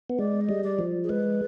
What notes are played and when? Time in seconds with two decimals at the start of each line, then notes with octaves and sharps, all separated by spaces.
0.10 B3
0.18 G#3 D5
0.41 D#5
0.49 G3
0.64 D5
0.79 F3
1.04 G#4
1.09 G#3 B4